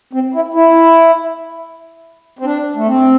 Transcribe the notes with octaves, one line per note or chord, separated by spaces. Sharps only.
C4
E4
E4
C4
D4
A3
C4